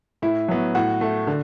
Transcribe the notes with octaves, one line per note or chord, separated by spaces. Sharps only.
A2 E4
F#3 B3
A2 F#4
A3
D3